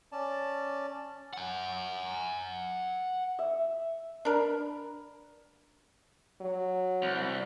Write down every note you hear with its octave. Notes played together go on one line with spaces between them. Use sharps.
C#4 D5 A5
F#5 G#5
E5
D4 A#4 B4
F#3
C2